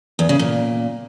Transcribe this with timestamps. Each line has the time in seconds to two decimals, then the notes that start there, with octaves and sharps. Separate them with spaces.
0.19 E2
0.29 C#3
0.39 A#2